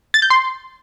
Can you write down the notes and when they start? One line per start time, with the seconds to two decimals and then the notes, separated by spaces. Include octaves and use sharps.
0.14 A6
0.22 G6
0.30 C6